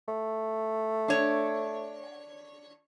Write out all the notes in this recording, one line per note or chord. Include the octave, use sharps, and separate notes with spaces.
A3
D4 C#5